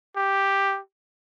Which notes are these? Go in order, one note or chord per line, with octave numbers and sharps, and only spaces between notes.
G4